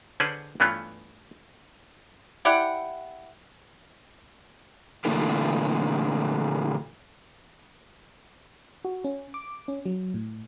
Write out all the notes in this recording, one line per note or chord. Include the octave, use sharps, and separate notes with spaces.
D3 C#4 G#4 B4 C5 D5
G2 E3 A3 B3 C#4 F4
E4 G4 D5 F#5
A#2 D3 E3 A3 A#3
F#4
C#4
D6
C#4
F#3
A2